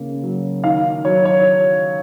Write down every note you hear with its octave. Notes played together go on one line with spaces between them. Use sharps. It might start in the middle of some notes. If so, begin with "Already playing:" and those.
Already playing: C#3 A#3
F#3
D#3 F5
F#3 C#5
C#5